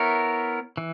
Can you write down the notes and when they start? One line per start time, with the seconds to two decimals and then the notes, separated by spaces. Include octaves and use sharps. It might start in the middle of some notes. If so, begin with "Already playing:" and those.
Already playing: B3 E4 A#4 C#5
0.77 E3